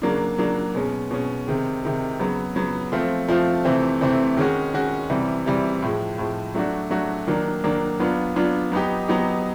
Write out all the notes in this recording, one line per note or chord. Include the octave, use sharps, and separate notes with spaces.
C#3 F#3 A#3 D4
C#3 F#3 A#3 D4
B2 G#3 C#4
B2 G#3 C#4
C3 D#3 G#3
C3 D#3 G#3
C#3 F#3 B3
C#3 F#3 B3
F3 A3 C4 F4
F3 A3 C4 F4
C3 E3 A3 C4
C3 E3 A3 C4
D#3 G#3 C#4 F#4
D#3 G#3 C#4 F#4
C3 E3 G3
C3 E3 G3
A2 F3 G#3
A2 F3 G#3
F#3 A3 D4 F#4
F#3 A3 D4 F#4
D#3 F#3 A#3 D4
D#3 F#3 A#3 D4
F#3 B3 D4 F4
F#3 B3 D4 F4
F#3 B3 D#4 G4
F#3 B3 D#4 G4